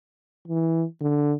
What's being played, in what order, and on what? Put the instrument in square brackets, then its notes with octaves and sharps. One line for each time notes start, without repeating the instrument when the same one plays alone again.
[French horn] E3
D3